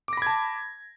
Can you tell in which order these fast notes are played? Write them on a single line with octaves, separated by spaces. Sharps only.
D6 A#6 B5 G#6 A5